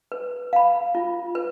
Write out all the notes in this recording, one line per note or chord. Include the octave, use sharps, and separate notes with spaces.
B4
F5 B5
F4
B4